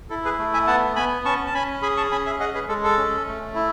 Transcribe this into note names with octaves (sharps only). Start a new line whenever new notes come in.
E4 A4
G#4 B4
A3
E5 G#5
B3 F#5 A5
B3 G#5 B5
C#4 A5 C#6
A5
C#4 G#5 B5
G#4 G#5 B5
A5 C#6
C#4 G#5 B5
E5 G#5
G#4 D#5 F#5
G#4 B4
G#3 A4
A4
C#4
A3
E4